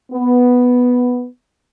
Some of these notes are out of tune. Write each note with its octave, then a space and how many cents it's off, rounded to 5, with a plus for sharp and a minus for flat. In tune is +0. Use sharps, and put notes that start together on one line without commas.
B3 +0